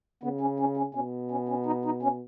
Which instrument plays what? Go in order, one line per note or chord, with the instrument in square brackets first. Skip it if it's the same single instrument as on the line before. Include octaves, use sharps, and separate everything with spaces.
[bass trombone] C#3 [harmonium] B3
[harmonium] C#4
C#4
C#4
[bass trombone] B2 [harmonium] C#4
[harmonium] C#4
C#4
D#4
D#4
C#4